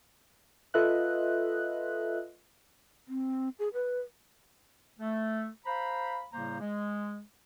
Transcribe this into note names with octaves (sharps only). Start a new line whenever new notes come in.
F4 A4 B4 D#5 E5 F#6
C4
G#4
B4
A3
C5 F5 A#5 B5
A2 C#3 G3 A#3 C5 A#5
G#3